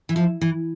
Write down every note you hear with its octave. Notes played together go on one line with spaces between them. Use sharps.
E3
F3
E3